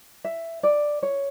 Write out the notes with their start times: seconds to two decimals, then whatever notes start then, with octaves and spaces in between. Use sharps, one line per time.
0.24 E5
0.63 D5
1.03 C#5